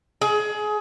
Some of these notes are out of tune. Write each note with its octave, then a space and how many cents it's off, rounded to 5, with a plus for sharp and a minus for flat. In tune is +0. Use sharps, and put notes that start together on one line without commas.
G#4 +25